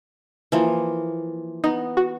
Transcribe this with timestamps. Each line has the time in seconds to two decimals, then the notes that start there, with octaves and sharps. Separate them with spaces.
0.52 E3 F3 A#3
1.64 B3 D#4
1.97 F#4